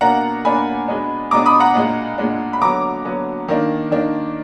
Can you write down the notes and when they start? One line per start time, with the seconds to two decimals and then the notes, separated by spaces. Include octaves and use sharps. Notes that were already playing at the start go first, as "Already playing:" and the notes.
0.01 B2 A#3 D4 F#5 A#5
0.45 B2 A#3 D4 G#5 B5
0.88 B2 G#3 B3 D4
1.31 B2 G#3 B3 D4 A#5 D6
1.46 B5 D#6
1.60 F#5 A#5
1.75 A#2 G#3 D4
2.18 A#2 G#3 D4
2.53 B5
2.61 D3 F#3 B3 A#5 D6
3.05 D3 F#3 B3
3.48 D#3 A#3 D4
3.91 D#3 A#3 D4